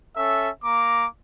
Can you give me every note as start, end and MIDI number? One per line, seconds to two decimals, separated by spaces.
0.16 0.50 61
0.16 0.50 69
0.16 0.50 76
0.64 1.07 58
0.64 1.07 82
0.64 1.07 86